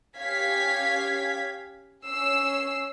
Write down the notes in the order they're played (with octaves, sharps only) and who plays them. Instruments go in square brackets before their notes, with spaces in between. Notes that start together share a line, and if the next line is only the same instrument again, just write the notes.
[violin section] C#4 G4 F5 G#6 B6
C#4 E6 C7